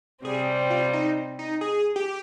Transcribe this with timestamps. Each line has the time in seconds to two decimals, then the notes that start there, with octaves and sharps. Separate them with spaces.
0.25 C3 G3 C4 G#4
0.70 F4
0.93 D#4
1.39 D#4
1.61 G#4
1.96 G4